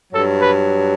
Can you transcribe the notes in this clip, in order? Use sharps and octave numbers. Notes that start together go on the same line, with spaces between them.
G2 F#3 A4
B4